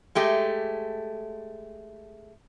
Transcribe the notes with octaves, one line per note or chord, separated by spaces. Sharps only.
G#3 A3 G4